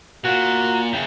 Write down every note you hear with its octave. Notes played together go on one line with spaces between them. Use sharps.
A#2 F#4
F#2 C#3 G5